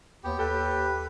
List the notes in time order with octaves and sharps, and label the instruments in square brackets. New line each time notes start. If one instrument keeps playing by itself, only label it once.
[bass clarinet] D#2 [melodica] B3 [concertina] G4
[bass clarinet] D#2 [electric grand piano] A4 G5 [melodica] B4